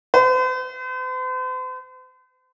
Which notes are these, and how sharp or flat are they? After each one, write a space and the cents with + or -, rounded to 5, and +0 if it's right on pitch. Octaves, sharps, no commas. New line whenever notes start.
C5 -45